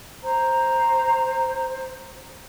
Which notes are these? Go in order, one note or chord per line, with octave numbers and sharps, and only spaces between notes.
C5 A#5